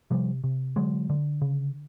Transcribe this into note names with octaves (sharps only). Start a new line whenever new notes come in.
C3 F3 G3
C3
D3 F#3 G#3
D3
C#3